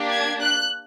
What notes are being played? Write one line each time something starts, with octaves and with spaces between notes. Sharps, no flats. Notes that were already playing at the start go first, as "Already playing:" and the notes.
Already playing: A#3 D4 G4
G#6
F#6